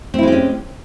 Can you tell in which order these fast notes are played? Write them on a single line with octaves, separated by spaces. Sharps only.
C4 E4 G#3 G4 C#4